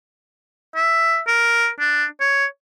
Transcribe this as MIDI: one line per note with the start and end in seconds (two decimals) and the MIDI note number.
0.76 1.20 76
1.28 1.68 70
1.80 2.05 62
2.21 2.45 73